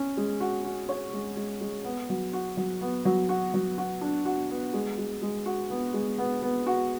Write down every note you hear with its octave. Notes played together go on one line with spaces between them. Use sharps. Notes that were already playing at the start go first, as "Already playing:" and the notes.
Already playing: C#4
G#3
F#4
F#4
C#5
G#3
G#3
G#3
B3
F#3
F#4
F#3
B3
F#3
F#4
F#3
F#4
D4
F#4
B3
G#3
G#3
G#3
F#4
B3
G#3
B3
B3
F#4